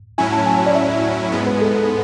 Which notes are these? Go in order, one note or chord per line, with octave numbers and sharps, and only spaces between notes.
A2 F#3 C#4 E4 G#5
A5
G#5
D5
E5
G#2 G#3 B3
B4
A4
A4